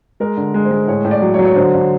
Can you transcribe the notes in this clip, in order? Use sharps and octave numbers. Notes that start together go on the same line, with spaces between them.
G#3 A#4
D3
G#3
C5
G#3
A2 C#5
A2
D5
F#3
C#5
F#3
C#5
D3 C5
D3